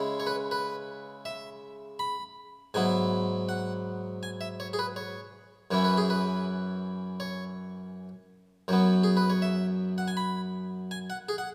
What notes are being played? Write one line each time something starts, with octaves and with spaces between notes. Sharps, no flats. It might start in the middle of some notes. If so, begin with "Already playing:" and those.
Already playing: C#3 G#3 C#4 E4
C#5
B4
B4
E5
B5
G#2 F#3 B3 E4 G#5
F#5
G#5
E5
C#5
G#4
B4
C#5
F#2 E3 C#4 E4 C#5
B4
G#4
B4
C#5
F#2 F#3 B3 C#5
G#4
B4
C#5
E5
F#5
G#5
B5
G#5
F#5
G#4
F#5